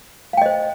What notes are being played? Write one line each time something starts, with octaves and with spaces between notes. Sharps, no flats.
C5 D#5 F5 G5